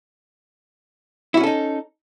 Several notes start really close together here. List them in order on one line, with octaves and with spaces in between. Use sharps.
E4 F#4 C#4 A4 D#4